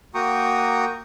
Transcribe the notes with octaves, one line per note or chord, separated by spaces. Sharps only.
A#3 F#4 G5 A#5 C#6 D#6